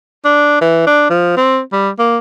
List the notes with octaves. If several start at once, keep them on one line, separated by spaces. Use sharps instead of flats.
D4
E3
D4
F3
C4
G3
A#3